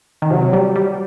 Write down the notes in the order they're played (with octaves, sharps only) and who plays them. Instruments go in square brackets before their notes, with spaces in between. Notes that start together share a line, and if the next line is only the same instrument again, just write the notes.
[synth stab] D#3
[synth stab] C3 [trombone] F#3
[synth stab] G3
G3